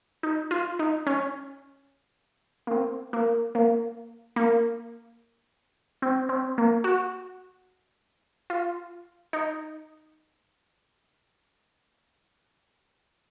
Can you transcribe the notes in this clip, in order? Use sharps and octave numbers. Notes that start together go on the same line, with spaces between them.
D#4
F4
D#4
C#4
A#3
C4
A#3
A#3
A#3
C4
C4
A#3
F#4
F4
D#4